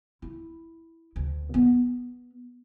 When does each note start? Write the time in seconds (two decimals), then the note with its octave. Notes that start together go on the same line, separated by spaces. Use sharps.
0.22 E4
1.16 D2
1.54 B3